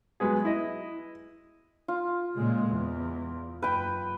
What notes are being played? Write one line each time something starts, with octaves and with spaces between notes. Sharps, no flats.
F#3 G#3 B3 G#4
E4 D#5
F4
A#2 C#3 G#3
E2
F#1 B4 G5